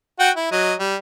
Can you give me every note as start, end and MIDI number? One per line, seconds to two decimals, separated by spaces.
0.19 0.30 66
0.19 0.30 78
0.19 0.30 79
0.36 0.51 64
0.52 0.74 54
0.52 0.74 75
0.79 0.96 55